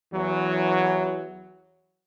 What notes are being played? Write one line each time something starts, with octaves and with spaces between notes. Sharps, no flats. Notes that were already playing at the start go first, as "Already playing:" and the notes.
E2 E3 F#3